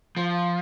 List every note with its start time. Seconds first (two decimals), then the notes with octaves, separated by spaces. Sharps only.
0.17 F3